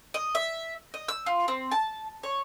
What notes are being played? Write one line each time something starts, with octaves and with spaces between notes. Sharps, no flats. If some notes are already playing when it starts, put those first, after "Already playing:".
D#5
E5
D#5
E6
F4
C4
A5
C#5